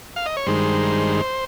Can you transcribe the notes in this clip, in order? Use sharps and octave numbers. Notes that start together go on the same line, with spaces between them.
F5
D#5
C#5
G2 D#3 G#3 C5